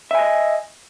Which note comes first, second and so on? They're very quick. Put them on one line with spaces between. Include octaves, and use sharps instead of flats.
E5 G#5 D#5